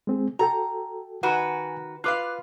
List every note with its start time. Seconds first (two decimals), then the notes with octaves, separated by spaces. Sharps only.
0.07 G#3 C4 G#4
0.39 F#4 A4 G5 A#5
1.23 D#3 F#4 B4 F#5 G#5
2.04 F4 B4 F5 D6 F#6